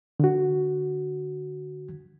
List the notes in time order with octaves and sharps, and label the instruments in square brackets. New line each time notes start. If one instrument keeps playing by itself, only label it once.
[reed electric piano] D3 F#4